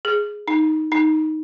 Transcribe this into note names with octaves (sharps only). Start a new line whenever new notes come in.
G#4
D#4
D#4